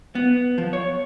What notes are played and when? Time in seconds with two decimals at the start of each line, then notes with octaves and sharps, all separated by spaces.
0.15 B3
0.58 F3
0.73 C#5